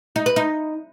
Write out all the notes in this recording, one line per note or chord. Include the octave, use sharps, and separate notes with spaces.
D#4
B4
D#4